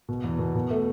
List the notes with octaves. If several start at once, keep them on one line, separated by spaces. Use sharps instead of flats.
B2
E2
B2
B2
A3